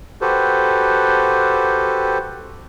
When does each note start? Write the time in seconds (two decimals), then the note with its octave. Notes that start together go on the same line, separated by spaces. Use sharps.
0.21 F#4 G4 A4 B4 C5